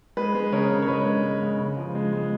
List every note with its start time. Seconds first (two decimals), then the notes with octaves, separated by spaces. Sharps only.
0.17 G#3 B4
0.35 G#3
0.52 C#3 A#4 C#5
0.70 C#3
0.82 C#5
0.88 G#3 B4
1.06 G#3
1.24 G#3
1.42 C#3
1.59 C#3
1.77 F3
1.95 G#3
2.13 G#3